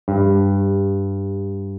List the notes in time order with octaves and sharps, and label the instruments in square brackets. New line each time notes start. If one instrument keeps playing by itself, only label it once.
[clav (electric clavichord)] G2